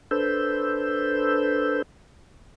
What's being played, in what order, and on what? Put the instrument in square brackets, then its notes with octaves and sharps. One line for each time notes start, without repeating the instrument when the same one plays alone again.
[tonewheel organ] D4 A4 B4 C5 E6 G6